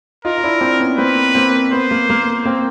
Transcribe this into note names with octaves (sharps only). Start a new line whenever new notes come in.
D#4 F4 A#4
D#4
D4 E4
C4 D4
B3 C#4
A#3 C4 B4
A#3 C4
B3 C5
A#3
A#3
A#3 C4